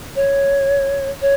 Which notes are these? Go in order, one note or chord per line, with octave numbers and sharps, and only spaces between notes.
C#5
C#5